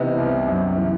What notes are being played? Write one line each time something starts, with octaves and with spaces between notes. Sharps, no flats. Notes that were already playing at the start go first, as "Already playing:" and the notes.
Already playing: C3 E3 B3 D#4
C2
F#2
E3